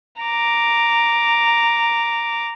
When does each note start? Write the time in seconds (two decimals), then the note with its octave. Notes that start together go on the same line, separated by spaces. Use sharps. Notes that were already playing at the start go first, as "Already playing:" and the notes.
0.22 A#5 D6